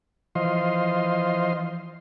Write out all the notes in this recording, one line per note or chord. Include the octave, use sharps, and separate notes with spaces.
E3 F3 C5 D#5 F5 C6